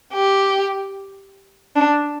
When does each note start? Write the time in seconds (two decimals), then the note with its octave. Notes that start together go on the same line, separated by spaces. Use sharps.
0.14 G4
1.76 D4